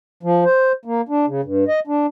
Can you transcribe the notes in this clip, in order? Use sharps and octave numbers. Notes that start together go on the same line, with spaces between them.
F3
C5
A#3
D4
C#3
G2
D#5
D4